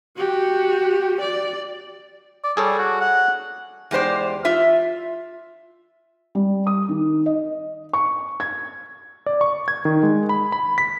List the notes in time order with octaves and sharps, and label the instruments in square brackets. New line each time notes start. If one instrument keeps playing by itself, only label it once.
[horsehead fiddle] F#4 G4
D5
[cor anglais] D5
[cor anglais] G3 [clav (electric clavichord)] G#4 A4 C#5
[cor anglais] F#4
F#5
[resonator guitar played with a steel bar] E2 G#3 G4 C5 D5
F4 E5
[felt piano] G3
D#6
D#3
D#5
C#6
G#6
[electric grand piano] D5
C#6
G#6
D#3
G#3
B5
B5
B6